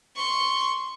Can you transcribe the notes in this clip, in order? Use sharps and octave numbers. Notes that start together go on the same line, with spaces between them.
C6 C#6